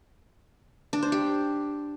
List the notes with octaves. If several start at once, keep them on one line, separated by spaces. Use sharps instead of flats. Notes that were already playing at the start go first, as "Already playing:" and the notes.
D4
C5
G4